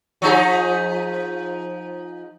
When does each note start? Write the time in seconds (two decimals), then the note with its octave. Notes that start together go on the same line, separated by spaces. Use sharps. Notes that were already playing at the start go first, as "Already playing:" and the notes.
0.22 F3 D#4 G#4